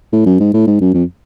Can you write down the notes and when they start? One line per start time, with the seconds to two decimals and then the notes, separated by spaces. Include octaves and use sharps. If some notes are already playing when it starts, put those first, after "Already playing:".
0.12 A2
0.26 F#2
0.40 G#2
0.54 A2
0.67 G#2
0.81 F#2
0.94 F2